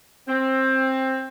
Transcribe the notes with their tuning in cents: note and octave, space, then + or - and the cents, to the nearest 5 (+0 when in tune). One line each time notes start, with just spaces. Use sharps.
C4 +15